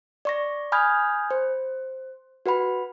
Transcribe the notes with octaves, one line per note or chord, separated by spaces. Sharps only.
D5 C#6 A#6
G#5 B5 D#6 F6 G6 G#6
C5
F#4 B4 F#5 B5